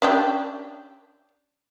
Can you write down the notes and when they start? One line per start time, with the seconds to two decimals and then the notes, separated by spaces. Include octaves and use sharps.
0.02 C#4 D4 G4